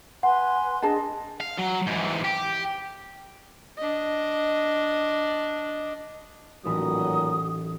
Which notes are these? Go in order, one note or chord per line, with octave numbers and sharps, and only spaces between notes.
B4 F#5 G#5 C6
D4 G#4 D#5 A5
F5
F#3
G#2 E3
G4
D4 D#5
A1 A#2 D#3 E3 F#3 B5 D#6